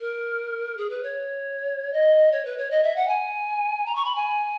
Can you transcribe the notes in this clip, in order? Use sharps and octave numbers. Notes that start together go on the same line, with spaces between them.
A#4
G#4
B4
C#5
D#5
C#5
B4
C#5
D#5
E5
F#5
G#5
A#5
C#6
B5
G#5